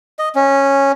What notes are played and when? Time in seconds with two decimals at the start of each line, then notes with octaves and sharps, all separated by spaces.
0.19 D#5
0.35 C#4